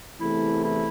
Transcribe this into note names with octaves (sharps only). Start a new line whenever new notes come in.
E2 C3 E3 A3 E4
E4